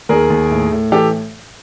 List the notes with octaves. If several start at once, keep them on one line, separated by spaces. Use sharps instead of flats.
D#2 G#4 A#4
D#2
A2
A2
E3 G4 A4